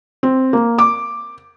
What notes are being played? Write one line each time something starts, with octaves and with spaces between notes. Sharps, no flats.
C4
A#3
D6